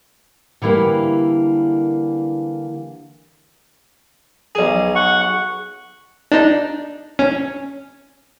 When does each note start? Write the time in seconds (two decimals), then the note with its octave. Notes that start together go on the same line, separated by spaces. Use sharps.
0.62 D3 E3 G3 A#3
4.55 B1 G#4
4.95 F#5 C#6
6.32 D4 D#4
7.19 C#4